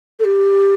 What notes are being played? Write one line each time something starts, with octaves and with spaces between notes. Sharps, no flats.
A4
G4